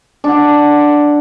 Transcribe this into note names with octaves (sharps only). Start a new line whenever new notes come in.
D4 F#5